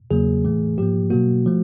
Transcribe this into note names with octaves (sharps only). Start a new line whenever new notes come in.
E2 C#3 F#3 A#3 G#4
A2 E3 A3
G#2 F3 A#3 G4
B2 F#3 A#3 F#4
F3 A3